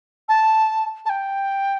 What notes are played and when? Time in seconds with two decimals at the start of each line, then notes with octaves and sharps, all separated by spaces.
0.29 A5
1.06 A5
1.10 G5